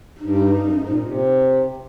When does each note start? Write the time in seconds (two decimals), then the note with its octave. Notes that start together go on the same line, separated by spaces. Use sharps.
0.21 G2 D#4
0.62 F#2
0.76 G#2
0.89 A#2
1.03 C3